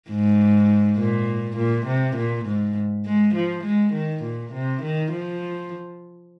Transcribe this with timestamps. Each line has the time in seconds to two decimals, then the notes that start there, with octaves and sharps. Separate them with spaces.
0.10 G#2
0.98 A#2
1.57 A#2
1.87 C3
2.17 A#2
2.46 G#2
3.06 G#3
3.35 F3
3.64 G#3
3.93 D#3
4.23 A#2
4.53 C3
4.83 D#3
5.12 F3